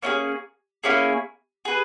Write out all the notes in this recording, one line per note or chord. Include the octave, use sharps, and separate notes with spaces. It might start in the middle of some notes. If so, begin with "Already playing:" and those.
A#3 C#4 E4 G#4
A#3 C#4 E4 G#4
G#4 B4